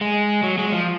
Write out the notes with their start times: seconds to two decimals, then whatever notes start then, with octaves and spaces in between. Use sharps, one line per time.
0.01 G#3
0.43 F#3
0.58 G#3
0.72 F3